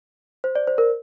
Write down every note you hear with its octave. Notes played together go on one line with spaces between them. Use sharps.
C5
D5
C5
A#4